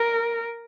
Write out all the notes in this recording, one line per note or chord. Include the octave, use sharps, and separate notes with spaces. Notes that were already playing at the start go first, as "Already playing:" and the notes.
Already playing: A#4